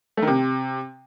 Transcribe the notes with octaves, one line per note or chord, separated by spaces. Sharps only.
A3
D#3
C3